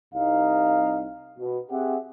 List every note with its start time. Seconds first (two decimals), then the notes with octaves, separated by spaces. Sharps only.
0.14 C2 D#4 F5
1.39 B2
1.70 C4 G4 G#4 E5 F#5